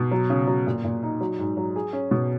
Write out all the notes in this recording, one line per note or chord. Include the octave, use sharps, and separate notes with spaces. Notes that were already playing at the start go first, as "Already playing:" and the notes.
Already playing: B2
F#3
C#3
F#3
A#2
A#2
D#4
F#3
G#2
F#3
G#4
C#4
B2